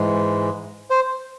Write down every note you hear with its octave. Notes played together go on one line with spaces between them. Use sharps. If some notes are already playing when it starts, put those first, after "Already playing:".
Already playing: G#2 E3 G#3
C5